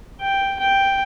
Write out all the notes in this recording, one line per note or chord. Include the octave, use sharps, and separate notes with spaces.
G5
G5